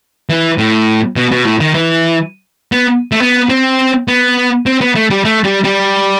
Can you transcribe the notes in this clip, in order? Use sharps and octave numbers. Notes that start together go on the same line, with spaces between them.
E3
A2
B2
B2
A2
D#3
E3
B3
A3
B3
C4
B3
C4
B3
A3
G3
A3
G3
G3